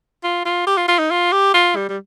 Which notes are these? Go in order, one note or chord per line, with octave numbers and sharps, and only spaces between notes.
F4
F4
G4
F4
F4
D#4
F4
G4
F4
G3
G3